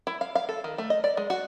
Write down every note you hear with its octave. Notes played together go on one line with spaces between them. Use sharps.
E4
F5
F5
A4
D#3
A3
D#5
D5
G#3
F#4